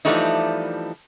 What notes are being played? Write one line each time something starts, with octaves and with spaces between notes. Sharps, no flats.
E3 F3 G3 A3 D4 D#4